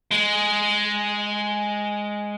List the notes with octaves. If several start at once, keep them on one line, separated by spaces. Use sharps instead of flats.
G#3